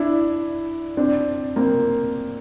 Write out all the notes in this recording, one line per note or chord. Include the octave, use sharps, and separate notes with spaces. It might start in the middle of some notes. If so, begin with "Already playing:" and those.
Already playing: D4 E4
C4 D4
A#3 C4